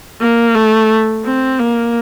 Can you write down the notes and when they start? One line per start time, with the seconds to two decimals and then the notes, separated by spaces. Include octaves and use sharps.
0.21 A#3
0.55 A3
1.25 C4
1.60 A#3